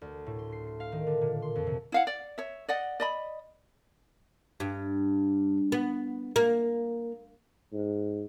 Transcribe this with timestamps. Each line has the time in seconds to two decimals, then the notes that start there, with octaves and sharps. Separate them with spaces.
0.01 D2
0.26 A2
0.39 C6
0.52 C7
0.67 C7
0.80 F5
0.92 D#3
1.07 D3
1.21 A#2
1.42 C6
1.55 F2
1.67 C3
1.92 E4 F5 F#5
2.07 D5
2.38 C#5 E5
2.68 D5 D#5 F#5
3.00 D5 D#5 B5
4.60 G2
5.72 B3
6.36 A#3
7.72 G#2